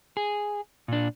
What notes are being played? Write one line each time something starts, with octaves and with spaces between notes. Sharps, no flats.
G#4
A#2 D4